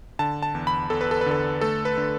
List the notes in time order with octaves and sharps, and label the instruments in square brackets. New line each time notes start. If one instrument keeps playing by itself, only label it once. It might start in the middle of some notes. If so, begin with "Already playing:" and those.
[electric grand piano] D3 A5
A5
E2
B5
E2 A4
B4
A4
B4
D3 A4
A3 A4
B4
D3